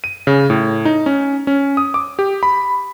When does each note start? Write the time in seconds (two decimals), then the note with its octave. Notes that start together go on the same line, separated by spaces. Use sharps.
0.04 D#7
0.27 C#3
0.50 A2
0.85 D#4
1.06 C#4
1.47 C#4
1.77 D#6
1.94 D6
2.19 G4
2.43 B5